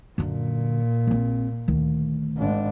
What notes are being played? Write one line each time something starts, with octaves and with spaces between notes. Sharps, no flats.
F#2 A#2 D3
A#1 C4
D2 D#3
G#1 D4